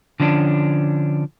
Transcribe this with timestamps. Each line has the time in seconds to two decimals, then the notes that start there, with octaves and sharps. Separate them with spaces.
0.20 D3 F3 C#4 D4